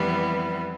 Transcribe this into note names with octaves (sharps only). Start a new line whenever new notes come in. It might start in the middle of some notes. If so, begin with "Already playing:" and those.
Already playing: F2 E3 G3 B3